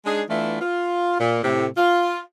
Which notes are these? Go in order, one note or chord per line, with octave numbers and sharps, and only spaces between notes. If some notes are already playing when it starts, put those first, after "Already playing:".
G#3 D4 D#4 G#4
E3 A3 B3 D4 E4 F4
F4
A#2
A2 C3
F4